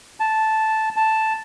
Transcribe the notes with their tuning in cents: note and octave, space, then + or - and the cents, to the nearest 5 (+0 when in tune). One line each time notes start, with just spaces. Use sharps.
A5 -5
A5 +0